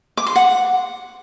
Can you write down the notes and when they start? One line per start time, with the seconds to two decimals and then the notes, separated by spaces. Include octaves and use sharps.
0.17 D6
0.26 C6
0.36 F#5